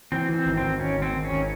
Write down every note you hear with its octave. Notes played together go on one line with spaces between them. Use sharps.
E3 C4
E3
C4
G#1
G#1 C4
G#1 C#4
G#1
C4
G#1
C#4
G#1